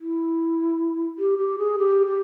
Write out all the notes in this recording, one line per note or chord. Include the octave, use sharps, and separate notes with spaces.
E4
G4
G4
G#4
G4
G4